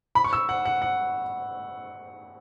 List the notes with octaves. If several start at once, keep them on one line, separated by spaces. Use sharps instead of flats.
B5
C#6
E6
F#5
F#5
F#5